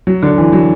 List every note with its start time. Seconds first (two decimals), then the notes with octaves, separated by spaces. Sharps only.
0.07 F#3
0.23 D3
0.38 E3
0.53 F#3